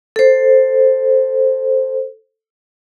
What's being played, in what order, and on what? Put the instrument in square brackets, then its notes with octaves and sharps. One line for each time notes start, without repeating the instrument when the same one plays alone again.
[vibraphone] A4 C5